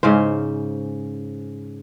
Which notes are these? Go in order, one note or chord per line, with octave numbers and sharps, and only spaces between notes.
G#2 C#3 C#4 C5